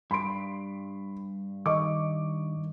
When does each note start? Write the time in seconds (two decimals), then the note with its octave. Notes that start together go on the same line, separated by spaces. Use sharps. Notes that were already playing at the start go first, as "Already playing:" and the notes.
0.11 G2 B5 C6 D7
1.66 D#3 D#5 C#6 D6